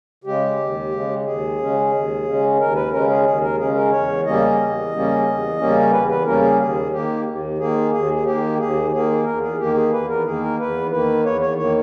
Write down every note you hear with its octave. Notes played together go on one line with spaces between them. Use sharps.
C#3 G#3 G4
D#2
C#3 G#3
D#2 G#4
C#3 G#3 C#4
D#2
C#3 G#3 C#4
D#2 A#4
B4
C#3 G#3 C#4 A#4
G#4
D#2 G#4
A#4
C#3 G#3 C#4 G#4
A#4
E2 C#5
C#3 G3 A#3 C#4 D#5
E2
C#3 G3 A#3 C#4
E2
C#3 G3 A#3 C#4
E2 B4
B4
C#3 G3 A#3 C#4 A#4
G#4
D#2 G#4
D#3 A#3 G4
D#2
D#3 A#3 G#4
D#2 G#4
G#4
D#3 A#3 G4
D#2 G#4
D#3 A#3 G#4
E2 A#4
G#4
D#3 A#3 G4
G#4
E2 B4
A#4
D#3 A#3 G#4
A#4
E2 B4
D#3 A#3 B4
E2 C#5
C#5
D#3 A#3 C#5